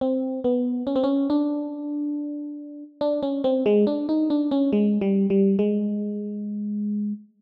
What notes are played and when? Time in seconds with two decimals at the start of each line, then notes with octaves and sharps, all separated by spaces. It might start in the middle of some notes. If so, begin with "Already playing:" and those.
0.01 C4
0.44 B3
0.87 C#4
0.96 C4
1.04 C#4
1.30 D4
3.01 D4
3.23 C#4
3.44 C4
3.66 G#3
3.87 D4
4.09 D#4
4.30 D4
4.51 C#4
4.73 G#3
5.01 G3
5.30 G3
5.59 G#3